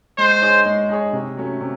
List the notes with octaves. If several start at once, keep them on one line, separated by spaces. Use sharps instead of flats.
G#3 C5
D#4 G#4 C#5
G#3
D#4 G#4 C#5
C3
F#3 A3 C#4
C3